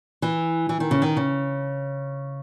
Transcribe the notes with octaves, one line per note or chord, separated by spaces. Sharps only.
E3
E3
D#3
C#3
D#3
C#3